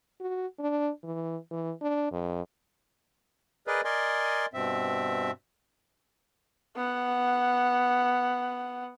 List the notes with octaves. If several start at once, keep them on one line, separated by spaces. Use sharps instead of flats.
F#4
D4
E3
E3
D4
F2
G#4 A#4 B4 D5 D#5
A#4 D5 D#5 G#5 C6
G2 B2 C4 E5
B3 F#5